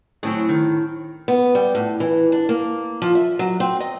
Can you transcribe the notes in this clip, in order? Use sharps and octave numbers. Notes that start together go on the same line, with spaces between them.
A2 F#3 C4 G#4
D#3
B3
G3
A2
E3
D4
A#3
F3
E5
F#3
C4
D#5